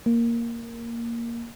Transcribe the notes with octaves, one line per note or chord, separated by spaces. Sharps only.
A#3